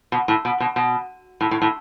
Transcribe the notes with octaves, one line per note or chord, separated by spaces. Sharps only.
B2
A2
B2
B2
B2
A2
A2
A2